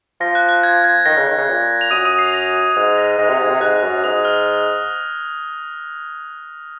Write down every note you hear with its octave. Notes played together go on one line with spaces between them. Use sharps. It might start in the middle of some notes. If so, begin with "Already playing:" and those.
F3 A#6
F#6
F#6
G#6
G#6
D#3 A#6
C#3
D#3
C#3
A#2
F7
F#2 D#6 D#7
D#6 D#7
C7
A#6
G#2 G#6
A#6
G#2 A#6
C3
G#2 G#6
C3
G#2 F#6
F#2
G#2 D#6
F6